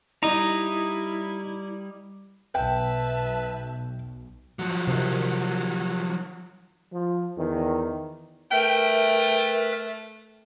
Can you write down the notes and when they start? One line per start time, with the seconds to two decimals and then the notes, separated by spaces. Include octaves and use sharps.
0.23 G3 D#4 E4 D#5 A#5
2.55 B1 B4 E5 G5 A5
4.59 F3 F#3
4.87 C3 D#3
6.92 F3
7.37 E2 D#3
8.51 A3 A#4 B4 E5 G5